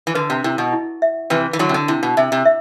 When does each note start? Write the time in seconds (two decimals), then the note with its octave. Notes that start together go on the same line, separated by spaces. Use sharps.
0.07 E3
0.15 D3 B4
0.30 C3
0.44 C3 E4
0.58 B2
0.73 E4
1.02 E5
1.30 C3 E3 B4
1.53 E3
1.59 D3 F#3 E4
1.69 C3
1.74 D3
1.88 C3 E4
2.03 B2
2.17 C3 E5
2.32 C3
2.46 E5